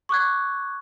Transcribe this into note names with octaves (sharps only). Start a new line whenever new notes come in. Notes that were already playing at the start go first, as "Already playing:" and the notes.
C#6 D6 F#6 G#6